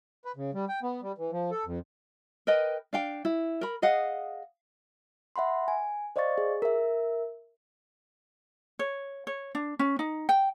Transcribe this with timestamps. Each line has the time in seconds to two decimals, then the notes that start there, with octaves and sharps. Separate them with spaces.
0.25 B4
0.36 C#3
0.54 G3
0.69 G5
0.83 B3
1.02 G3
1.18 E3
1.31 F3
1.51 A4
1.65 F2
2.47 A#4 B4 D#5 G5
2.93 D4 F5 G5
3.25 E4
3.61 A#4 B5
3.82 G#4 D#5 F5 F#5
5.36 E5 F#5 B5 C6
5.68 G#5
6.16 C5 D5 D#5 F5 C#6 A6
6.38 G#4
6.62 A#4 E5
8.79 C#5
9.27 C#5
9.55 D4
9.79 C#4
9.99 D#4
10.29 G5